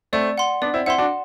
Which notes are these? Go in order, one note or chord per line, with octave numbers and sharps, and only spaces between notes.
A3 C4 D5
F#5 C6
B3 D4 D5
C4 E4
C4 E4 F#5 C6
D4 F#4